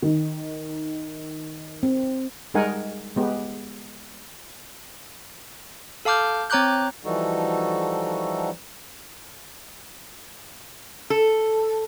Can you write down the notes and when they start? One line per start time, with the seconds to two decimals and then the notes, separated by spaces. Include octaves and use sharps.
0.02 D#3
1.83 C4
2.54 G3 G#3 D#4 A#4 F#5 G#5
3.16 G#3 B3 G4
6.05 A4 F5 A5 D6 F6 G6
6.50 C4 C#5 A#5 D6 F#6 G6
7.05 E3 F3 G3 D#4 F#4 A4
11.10 A4